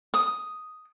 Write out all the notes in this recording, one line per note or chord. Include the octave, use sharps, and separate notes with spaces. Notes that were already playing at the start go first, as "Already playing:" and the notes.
D#6